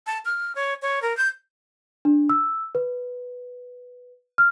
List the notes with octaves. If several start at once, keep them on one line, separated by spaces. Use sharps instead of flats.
A5
F6
C#5
C#5
A#4
G6
D4
E6
B4
F6